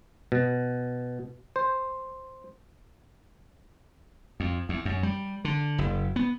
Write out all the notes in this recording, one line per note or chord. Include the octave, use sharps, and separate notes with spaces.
B2
C5
F2
E2
F#2
G3
D3
F#1
B3